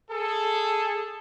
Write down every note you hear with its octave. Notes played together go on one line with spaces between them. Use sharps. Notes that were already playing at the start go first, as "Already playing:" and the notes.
G#4 A4